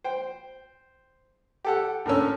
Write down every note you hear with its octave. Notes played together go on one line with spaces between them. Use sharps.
C5 G5
G4 A4 F#5
A2 D3 C#4 A#4 E6